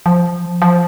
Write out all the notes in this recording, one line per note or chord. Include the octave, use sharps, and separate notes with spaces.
F3
F3